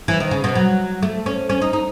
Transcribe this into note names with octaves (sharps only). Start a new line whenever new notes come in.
E3
D#3
C#3
B2
F#3
A3
C#4
C#4
D#4
D#4